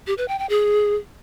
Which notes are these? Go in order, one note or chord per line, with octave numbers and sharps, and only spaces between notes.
G4
B4
G5
G5
G#4